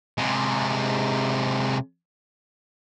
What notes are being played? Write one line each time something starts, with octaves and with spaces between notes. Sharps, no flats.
C3 G#3